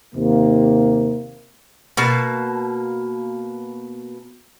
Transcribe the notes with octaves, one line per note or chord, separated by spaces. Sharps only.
D#2 C3 A#3
B2 A#3 A5